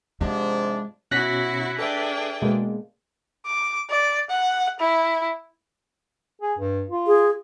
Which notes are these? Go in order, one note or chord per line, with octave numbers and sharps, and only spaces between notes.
G#2 C3 F3 G#3 D4
B2 C#4 E4 F#4 C#5 F#6 A#6 B6
D4 G#4 A4 B4 E5 G5
B2 G#3 A#3
D6
D5
F#5
E4
G#4
G2
F4
G#4